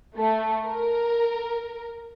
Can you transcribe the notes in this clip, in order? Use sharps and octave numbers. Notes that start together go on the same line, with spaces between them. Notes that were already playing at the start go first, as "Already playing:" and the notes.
A3
A#4